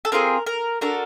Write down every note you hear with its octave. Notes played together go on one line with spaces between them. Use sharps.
A4
C4 F4 G#4 A#4
A#4
D4 F#4 A4 A#4